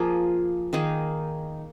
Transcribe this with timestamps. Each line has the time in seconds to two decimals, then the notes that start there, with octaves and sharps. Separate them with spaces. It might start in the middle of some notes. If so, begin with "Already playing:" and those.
Already playing: F3 A#3 G#4
0.73 D#3 A#3 D#4 G#4